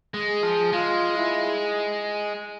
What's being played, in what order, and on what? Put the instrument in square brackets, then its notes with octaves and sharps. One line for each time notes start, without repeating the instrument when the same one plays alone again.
[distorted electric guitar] G#3
[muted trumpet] G#4
[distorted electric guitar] F3
[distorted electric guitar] G#3 [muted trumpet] F4
[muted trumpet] E4